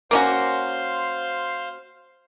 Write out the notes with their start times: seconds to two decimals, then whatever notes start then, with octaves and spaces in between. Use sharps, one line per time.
0.11 A#3 C#4 F#4 C5 F5 C6